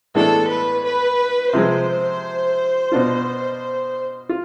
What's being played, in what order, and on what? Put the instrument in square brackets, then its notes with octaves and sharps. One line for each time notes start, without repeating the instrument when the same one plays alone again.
[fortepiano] A2 E3 G#3 B3 D4 [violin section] A4
[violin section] B4
B4
[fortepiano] C3 F3 G#3 [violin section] C5
[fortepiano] B2 B3 D4 F4
F4